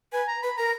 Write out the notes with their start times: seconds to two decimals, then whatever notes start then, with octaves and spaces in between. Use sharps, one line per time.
0.12 B4 G#5
0.27 A#5
0.42 B4 B5
0.57 A#4 A#5